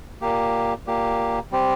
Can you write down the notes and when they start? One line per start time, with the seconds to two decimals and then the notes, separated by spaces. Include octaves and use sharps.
0.21 A#2 A#3 G4
0.87 A#2 A#3 G4
1.52 G3 C4 G4